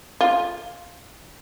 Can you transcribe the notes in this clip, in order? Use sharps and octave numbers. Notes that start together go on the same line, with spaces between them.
F4